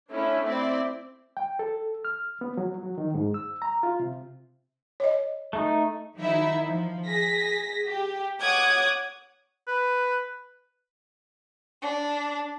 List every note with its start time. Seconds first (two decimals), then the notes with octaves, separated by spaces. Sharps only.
0.10 A3 C#4 D4 E4
0.45 C4 E4 D5
1.37 G5
1.59 A4
2.05 F6
2.41 B3
2.57 F#3
2.83 F#3
2.98 D#3
3.14 G#2
3.34 E6
3.62 A#5
3.83 F4
4.00 C3
5.00 C#5 D#5
5.53 A3 D#4
6.17 D#3 F#3 D#4 E4 E5
6.66 F3
7.07 G#4 A#6 B6
7.87 G4
8.41 C#5 F#5 D6 D#6 F#6 G#6
9.67 B4
11.81 D4